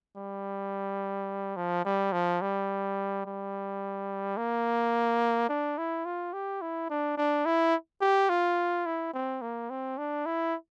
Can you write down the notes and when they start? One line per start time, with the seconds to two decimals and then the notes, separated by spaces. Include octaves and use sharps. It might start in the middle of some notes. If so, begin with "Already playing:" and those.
0.16 G3
1.56 F3
1.85 G3
2.13 F3
2.41 G3
3.26 G3
4.37 A#3
5.49 D4
5.78 E4
6.05 F4
6.33 G4
6.61 E4
6.90 D4
7.17 D4
7.46 E4
8.01 G4
8.30 F4
8.86 E4
9.14 C4
9.41 A#3
9.70 C4
9.98 D4
10.26 E4